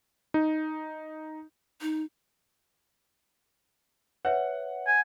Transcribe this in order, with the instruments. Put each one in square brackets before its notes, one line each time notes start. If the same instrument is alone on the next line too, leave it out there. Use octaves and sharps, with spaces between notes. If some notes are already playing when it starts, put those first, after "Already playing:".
[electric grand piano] D#4
[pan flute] D#4
[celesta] B4 C#5 E5 [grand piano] F#5
[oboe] G#5